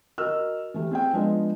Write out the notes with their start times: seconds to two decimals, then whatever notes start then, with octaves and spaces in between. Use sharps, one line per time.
0.18 F#4 A#4 D#5 E6 F6
0.74 E3 A3 G4
0.91 C4 G#4 G5
1.13 F3 G#3 B3 D4 F4 G#4